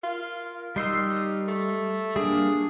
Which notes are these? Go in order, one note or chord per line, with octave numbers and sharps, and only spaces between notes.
F4 A#4
G3 D#4 C6 E6
A3
G3 A#3 D4 G#4